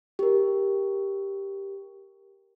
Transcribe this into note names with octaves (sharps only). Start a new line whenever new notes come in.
G4 A#4